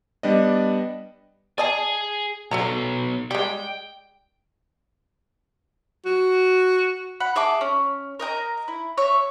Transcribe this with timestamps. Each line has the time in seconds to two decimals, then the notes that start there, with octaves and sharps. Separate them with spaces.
0.23 G3 B3 D4 D5 D#5
1.58 G#4 D5 D#5 G#5 A5
2.51 B1 F#3 A4 D#5 A#5
3.31 G3 G#3 G5
6.05 F#4
7.20 F#5 B5
7.36 G#4 E5 A5 D6
7.61 C#4
8.20 A#4 D#5 G5 A#5
8.68 E4
8.98 C#5 E5